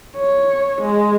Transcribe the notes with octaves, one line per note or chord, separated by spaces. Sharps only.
C#5
G#3